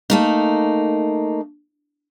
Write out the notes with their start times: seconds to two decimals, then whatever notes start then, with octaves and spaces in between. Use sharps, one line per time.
0.10 A3 A#3 D#4